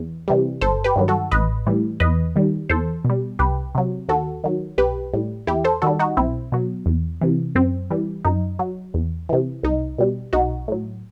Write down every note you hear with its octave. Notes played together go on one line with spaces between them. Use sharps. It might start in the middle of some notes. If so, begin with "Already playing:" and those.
Already playing: E2
C3 E3 G3
G1 A4 C5
G4 B4
G2 D#3 F#3
F#4 A4
A1 B4 D#5
A2 E3 G3
E2 B4 D#5
D#3 G3
E2 A4 C5
B2
G3
C2 G4 B4
C3 F#3
D#2 F#4 A4
D#3 F#3
B1 G4 B4
A2 G3
E2 E4 G4
A4 C5
D#3 G3 F#4 A4
D#4 F#4
B1 C4 E4
B2 F#3
E2
C3 E3
F#2 C4
E3 G3
F#2 D#4
F#3
E2
C3 E3
C2 D#4
B2 G3
B1 D#4 F#4
A2 F#3